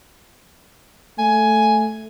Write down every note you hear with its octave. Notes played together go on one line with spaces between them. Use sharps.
A3 G#5